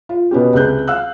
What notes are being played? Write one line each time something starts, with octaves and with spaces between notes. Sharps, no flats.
F4
B2 B3 C#4 G4
C#2 C3 B4 F#6 G6
F5 E6 F#6